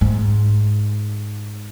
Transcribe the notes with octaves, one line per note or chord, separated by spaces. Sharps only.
G#2